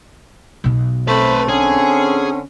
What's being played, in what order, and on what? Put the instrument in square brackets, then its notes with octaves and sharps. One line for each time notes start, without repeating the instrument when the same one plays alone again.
[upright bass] B1 B2
[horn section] A3 C4 [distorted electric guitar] B4 C5
[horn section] D3 C4 C#4 [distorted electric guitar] G#4